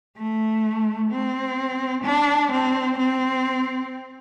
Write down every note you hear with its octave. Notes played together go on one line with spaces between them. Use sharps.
A3
C4
D4
C4
C4